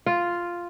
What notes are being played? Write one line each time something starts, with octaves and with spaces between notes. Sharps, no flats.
F4